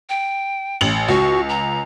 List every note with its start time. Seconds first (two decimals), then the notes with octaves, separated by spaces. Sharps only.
0.09 G5
0.81 A1 F#7
1.08 C#2 F#4
1.49 A#5